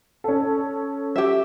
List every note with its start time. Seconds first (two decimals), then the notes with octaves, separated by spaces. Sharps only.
0.24 C#4 A4
1.16 G4 E5